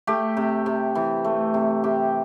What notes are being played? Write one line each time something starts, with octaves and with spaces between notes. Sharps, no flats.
A3 G4
C3
C3
E3
A3
C3
C3 G4